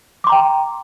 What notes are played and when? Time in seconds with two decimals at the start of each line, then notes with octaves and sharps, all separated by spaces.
0.24 D6
0.27 C6
0.29 A#5
0.32 G5